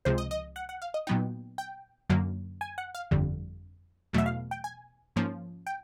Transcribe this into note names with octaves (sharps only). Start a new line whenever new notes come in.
C#2 C3 F3 G#3 C5
D#5
D#5
F#5
F#5
F5
D#5
A#2 F#3 B3 D#4 G5
G5
F#2 D3 F#3 A#3
G#5
F#5
F5
G1 F2 D3 G3
E2 B2 F#3 A3 E5
F5
G5
G#5
G#2 F3 A#3 C#4
G5